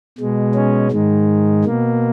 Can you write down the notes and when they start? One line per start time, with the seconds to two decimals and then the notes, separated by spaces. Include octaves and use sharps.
0.19 B2 G#3
0.55 C#4
0.91 G#2 D#3 G#3
1.65 B2 A#3